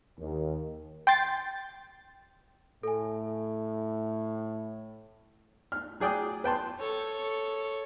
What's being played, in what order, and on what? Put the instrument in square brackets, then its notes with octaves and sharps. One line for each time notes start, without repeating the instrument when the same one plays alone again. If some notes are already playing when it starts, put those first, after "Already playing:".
[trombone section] D#2
[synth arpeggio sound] G5 C6 A6
[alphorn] A2 [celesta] A4 G#5
[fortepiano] F6
F#3 G#4 D5 G5 D#6
B4 G5 A5 C6
[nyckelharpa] A4 C#5